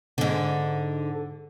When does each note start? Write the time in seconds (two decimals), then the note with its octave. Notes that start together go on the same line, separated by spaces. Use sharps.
0.18 G#2 D3